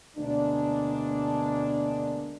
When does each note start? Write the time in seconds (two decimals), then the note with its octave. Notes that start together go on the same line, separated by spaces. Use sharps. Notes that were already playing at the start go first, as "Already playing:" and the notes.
0.17 D2 B2 G#3 A#3 D4